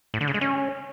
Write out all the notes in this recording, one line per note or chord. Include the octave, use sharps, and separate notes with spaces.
A2
D3
C#3
G#3
C#4